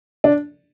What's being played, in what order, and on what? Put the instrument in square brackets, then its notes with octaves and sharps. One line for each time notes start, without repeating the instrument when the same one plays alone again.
[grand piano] D4